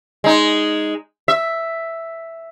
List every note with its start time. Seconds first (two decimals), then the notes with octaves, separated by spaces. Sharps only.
0.24 G#3 D#4
1.28 E5